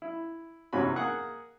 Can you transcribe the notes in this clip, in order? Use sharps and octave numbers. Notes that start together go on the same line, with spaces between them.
E4
E2 G#2 C3 C#4 F#4 B5
A#3 G#4 F#5